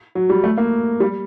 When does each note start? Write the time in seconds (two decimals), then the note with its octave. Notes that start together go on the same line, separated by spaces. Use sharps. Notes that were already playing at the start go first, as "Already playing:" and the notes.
0.15 F#3
0.29 G3
0.44 A3
0.58 A#3
1.00 G3